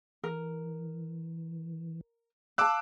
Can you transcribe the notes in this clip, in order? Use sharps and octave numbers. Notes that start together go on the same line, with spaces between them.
E3 A#4
F5 A5 D6 E6 F#6